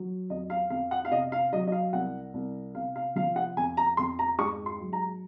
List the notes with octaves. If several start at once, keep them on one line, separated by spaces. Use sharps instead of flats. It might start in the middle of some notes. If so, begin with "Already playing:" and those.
Already playing: F#3
F2 D#5
F5
F2 F5
F#5
F5
C3 D#5
F5
F#3 D#5
D#5
F5
C2 F#5
C2
C3 F5
F5
F3 F5
F#5
F2 G#5
A#5
F2 C6
A#5
G#2 C#6
C6
F#3
A#5